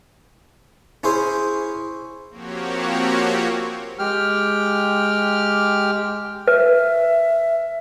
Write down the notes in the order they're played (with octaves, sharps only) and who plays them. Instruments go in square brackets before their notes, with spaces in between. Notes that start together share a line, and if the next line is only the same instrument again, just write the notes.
[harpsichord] C#4 E4 G#4 C5
[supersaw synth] F3 A#3 C4 F#4 G4 C#5
[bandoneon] G#3 G4 G5 F6
[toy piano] B4 [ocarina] E5